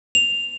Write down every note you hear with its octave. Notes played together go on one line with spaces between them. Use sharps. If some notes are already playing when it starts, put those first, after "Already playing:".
F7